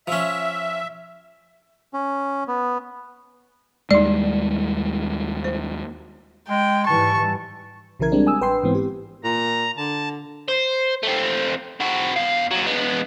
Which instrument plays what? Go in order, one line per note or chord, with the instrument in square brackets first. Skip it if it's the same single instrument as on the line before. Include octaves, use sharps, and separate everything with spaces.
[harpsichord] F3 C#4 [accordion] E5
[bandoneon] C#4
B3
[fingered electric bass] D#2 G3 G#3 [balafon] D#4 D5
[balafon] C5
[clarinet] G#3 [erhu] G5
[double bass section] G#2 E3 G3 [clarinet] A5 [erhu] C#6
[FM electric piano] B1 C#3 E3 E4 A#4 G#6
G3 G#3 C4 D4
G#5 D#6 E6
A1 B4 G5 C6 C7
G#2 E3 B3 C4
G4
[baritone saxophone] A#2 [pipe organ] A#5
[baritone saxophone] D3 [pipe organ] A5
[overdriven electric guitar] C5
A3 C4
C4 F#4
E2 F5
D#2 F#3
G#3 B3